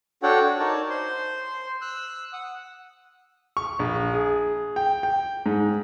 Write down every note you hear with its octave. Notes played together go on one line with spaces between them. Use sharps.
D4 F#4 A4 C#5 F#5 G5
F#4
D#4 A#4 C#5 D5 A5
C5 C6
E6 F#6
F#5 D#6
C#6
A#1
G#4
G5
G5
G#2